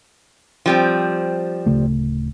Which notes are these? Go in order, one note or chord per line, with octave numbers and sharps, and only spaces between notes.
F3 G3 C4
D1 C#3 A3